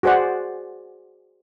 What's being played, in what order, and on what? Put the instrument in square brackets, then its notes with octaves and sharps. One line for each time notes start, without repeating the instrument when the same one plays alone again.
[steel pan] F#4 G#4 C5 D5 F#5